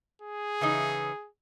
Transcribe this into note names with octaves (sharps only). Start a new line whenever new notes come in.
G#4
C#3 E3 D#4